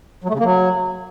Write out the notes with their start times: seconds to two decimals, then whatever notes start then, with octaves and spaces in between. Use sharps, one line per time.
0.24 F#3
0.29 A3
0.34 C#3
0.39 A#3
0.44 F#3